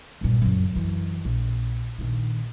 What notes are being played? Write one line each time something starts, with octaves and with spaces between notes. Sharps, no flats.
G2 A#2
F#2 C#3
F#2 E3
A#1
A#1 D#3